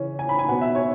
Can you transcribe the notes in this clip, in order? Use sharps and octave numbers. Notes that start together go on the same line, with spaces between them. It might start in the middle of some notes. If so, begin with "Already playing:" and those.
Already playing: C#3 E3 C#4
G#5
B5
G#5
B2 B3 F#5
E5
C#5